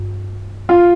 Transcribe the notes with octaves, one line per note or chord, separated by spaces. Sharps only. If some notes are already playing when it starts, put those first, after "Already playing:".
Already playing: G2
F4